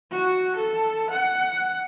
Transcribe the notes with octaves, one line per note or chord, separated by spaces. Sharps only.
F#4
A4
F#5